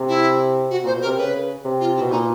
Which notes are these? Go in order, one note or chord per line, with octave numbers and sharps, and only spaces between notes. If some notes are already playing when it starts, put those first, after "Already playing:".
Already playing: C3
E4
F#4
A#2 C5
B2
A#4
C3
C#3 B4
C3
F4
E4
B2
A#2 D#4